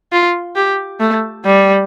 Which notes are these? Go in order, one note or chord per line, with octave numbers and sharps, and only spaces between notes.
F4
G4
A3
G3